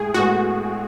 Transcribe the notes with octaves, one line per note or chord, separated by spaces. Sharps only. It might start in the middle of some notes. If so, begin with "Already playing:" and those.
Already playing: A2 G#3 G#4
A2 G#3 B3 F#4